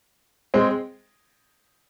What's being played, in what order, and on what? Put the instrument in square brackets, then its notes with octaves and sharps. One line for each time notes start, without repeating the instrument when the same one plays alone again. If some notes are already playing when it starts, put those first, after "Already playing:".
[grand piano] G#3 C4